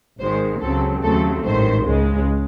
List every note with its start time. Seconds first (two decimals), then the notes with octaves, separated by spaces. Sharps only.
0.20 G#1 G#2 D#3 G#3 C5
0.61 C#2 C#3 F#3 C4 A4
1.02 D#2 C#3 F#3 A3 C4 A4
1.44 A1 G#2 D#3 C5
1.85 C#2 C#3 G#3